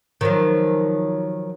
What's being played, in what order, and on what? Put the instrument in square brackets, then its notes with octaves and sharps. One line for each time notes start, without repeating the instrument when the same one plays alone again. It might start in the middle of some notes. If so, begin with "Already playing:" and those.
[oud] D#3 F3 F#3